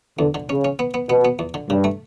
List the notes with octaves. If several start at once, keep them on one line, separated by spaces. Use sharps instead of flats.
E2 D3
D3
C#3 C#4
C#4
B3
B3
B2 B3
B3
E2
D3
G2 C#3
A3